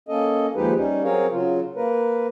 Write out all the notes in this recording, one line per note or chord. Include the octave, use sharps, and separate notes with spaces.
A#3 C#4 A4 D#5
D#2 F3 G#3 D#4 G4 B4
G3 C#4 D#4
F#3 C4 G#4 A#4 C#5 F5
C#3 F#3 F4
A#3 A#4 B4